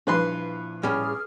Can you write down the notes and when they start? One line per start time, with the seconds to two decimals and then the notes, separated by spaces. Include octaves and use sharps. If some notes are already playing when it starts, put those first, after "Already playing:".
0.07 G2 A#2 F3 E4 B4 C6
0.83 A2 G3 C#4 G#4 F6